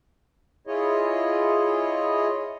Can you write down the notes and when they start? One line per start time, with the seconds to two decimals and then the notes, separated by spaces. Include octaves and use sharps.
0.67 E4 F4 G#4 C#5 D#5